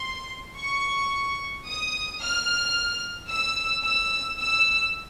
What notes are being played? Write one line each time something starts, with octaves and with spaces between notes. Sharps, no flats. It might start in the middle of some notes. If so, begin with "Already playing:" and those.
Already playing: C6
C#6
D#6
F6
E6
E6
E6